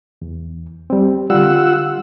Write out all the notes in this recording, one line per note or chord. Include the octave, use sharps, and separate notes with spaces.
E2
G3 C4
D3 G3 F4 F#5 E6